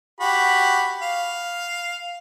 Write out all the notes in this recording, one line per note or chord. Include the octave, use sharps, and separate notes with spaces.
F#4 G4 B5
F5